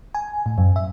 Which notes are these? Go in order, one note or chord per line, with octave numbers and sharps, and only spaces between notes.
G#5
A2
F#2
E5